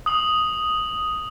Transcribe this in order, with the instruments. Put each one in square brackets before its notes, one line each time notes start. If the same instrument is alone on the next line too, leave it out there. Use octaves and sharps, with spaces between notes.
[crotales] D#6 F#7